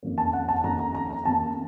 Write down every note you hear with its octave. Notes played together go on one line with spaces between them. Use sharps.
F2 D#3 A#3 C#4
A5
F#5
A5
F2 D#3 A#3 C#4 A#5
A#5
A#5
A#5
F2 D#3 A#3 C#4 A5